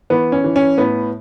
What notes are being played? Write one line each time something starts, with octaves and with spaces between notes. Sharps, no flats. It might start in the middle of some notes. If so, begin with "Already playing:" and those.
E3 B3
C#4
E3
C#4
A2 B3